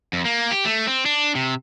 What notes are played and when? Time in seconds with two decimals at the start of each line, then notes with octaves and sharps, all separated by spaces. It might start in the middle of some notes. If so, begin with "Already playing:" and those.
0.13 F2
0.25 A#3
0.51 G4
0.65 A3
0.87 C4
1.06 D4
1.35 C3